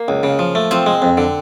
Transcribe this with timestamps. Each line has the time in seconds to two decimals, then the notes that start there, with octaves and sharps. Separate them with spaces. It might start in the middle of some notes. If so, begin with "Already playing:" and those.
Already playing: A#3
0.08 C#2
0.23 C#3
0.39 F3
0.55 A3
0.71 F3 C4
0.86 G#3
1.02 F2
1.18 D3